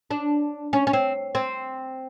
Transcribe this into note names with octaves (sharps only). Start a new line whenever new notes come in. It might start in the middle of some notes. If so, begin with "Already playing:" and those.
D4
C#4
C#4
C4
C4